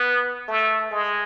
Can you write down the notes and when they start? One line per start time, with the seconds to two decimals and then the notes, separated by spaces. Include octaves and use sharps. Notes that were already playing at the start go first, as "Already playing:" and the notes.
Already playing: B3
0.48 A3
0.91 G#3